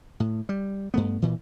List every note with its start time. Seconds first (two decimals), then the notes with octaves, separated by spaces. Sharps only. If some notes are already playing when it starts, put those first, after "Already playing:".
0.20 A2
0.49 G3
0.94 G2 A3 B3
1.22 A#2 E3